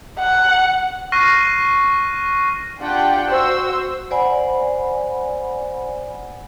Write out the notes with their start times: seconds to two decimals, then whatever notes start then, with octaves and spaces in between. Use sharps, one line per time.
0.19 F#5
1.12 C#6 F6 F#6 A#6 C7 D#7
2.79 D4 F4 G4 F#5 G5
3.28 F#4 C5 E6
4.11 C5 D5 F#5 G#5 B5